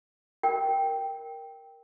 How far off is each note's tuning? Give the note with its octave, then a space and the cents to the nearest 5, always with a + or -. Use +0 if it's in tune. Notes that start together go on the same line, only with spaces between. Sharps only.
A#4 +0 G5 +0